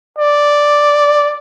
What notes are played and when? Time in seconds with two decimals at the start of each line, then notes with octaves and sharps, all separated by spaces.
0.19 D5